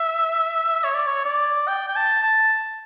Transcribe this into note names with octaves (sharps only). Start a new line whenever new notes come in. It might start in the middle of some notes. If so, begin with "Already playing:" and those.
Already playing: E5
C#5
D5
C#5
D5
G5
G5
A5
A5